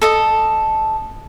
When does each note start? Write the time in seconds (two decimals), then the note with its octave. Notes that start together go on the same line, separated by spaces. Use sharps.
0.01 A4 D#5 A5